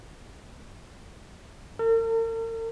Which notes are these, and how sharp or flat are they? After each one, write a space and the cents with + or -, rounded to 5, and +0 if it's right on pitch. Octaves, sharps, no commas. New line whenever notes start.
A#4 -45